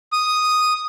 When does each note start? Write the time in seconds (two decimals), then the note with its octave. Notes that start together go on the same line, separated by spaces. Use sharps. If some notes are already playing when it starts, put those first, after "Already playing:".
0.12 D#6